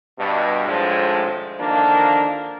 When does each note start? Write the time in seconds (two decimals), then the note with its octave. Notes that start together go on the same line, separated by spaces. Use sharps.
0.19 G2 B2
0.66 G#1 A2 F3 G#3 D4 C5
1.60 D3 D#3 F3 A#3 D4